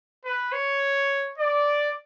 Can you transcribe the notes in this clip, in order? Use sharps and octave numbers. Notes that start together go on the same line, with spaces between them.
B4
C#5
D5